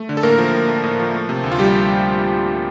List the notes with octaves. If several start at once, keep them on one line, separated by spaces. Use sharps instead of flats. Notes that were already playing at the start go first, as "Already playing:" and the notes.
Already playing: A3
D3
A4
A2 A#3 A#4
F3
A2
A3
A2
F3
A3
C3
D2
F4
F3 G3 G4